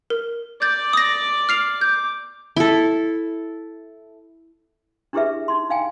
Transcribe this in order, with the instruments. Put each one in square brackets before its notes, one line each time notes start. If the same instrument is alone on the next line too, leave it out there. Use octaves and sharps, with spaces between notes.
[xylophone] A#4
[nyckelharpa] D5 D6 [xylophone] G6 A6
[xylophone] D#6 A#6
F6 C7 F7
[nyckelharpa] D6 [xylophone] G6
[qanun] E4 A4
[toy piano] D4 E4 G4 G#4 B4 E5
D#4 C6
D#4 F5 G5 G#5